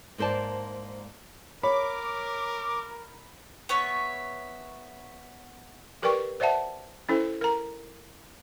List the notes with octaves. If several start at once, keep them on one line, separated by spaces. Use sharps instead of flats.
G#2 A#3 C5 D5 A5
A#4 C#5 B5 D6
B3 C#5 E5
G4 A#4 B4 D5 G5 C#6
C5 D5 E5 F#5 A5
C#4 E4 A4 C5
A#4 A#5